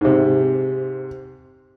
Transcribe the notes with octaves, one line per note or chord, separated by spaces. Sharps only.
G#2 C3